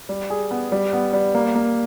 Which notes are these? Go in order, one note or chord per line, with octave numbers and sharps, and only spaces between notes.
G3
G#4
B3
G3
B3
G3
A#3
A#3